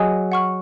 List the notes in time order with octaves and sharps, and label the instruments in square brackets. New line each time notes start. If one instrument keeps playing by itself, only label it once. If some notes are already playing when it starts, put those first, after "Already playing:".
Already playing: [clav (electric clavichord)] F#3 [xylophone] G#4 D#5 G#5 D#6
[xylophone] F#5 C#6 F6